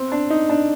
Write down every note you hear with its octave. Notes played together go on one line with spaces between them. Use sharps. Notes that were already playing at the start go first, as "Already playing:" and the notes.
Already playing: C4
D4
D#4
D4